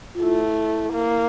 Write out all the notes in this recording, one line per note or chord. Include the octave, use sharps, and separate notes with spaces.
F4
A3 E4
A#3